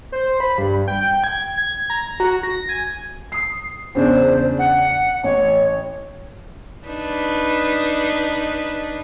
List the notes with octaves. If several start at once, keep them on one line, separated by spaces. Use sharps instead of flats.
C5
B5
G2
G5
G#6
G#6
A#5
F#4
A#6
G#5
D#6 C7
E2 C#3 D4 C5
F#5
A1 C#5
D4 D#4 B4